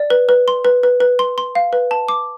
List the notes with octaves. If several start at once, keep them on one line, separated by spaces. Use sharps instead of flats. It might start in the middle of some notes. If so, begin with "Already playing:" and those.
Already playing: D5
B4
B4
C6
B4
B4
B4
C6
C6
F5
B4
A5
D6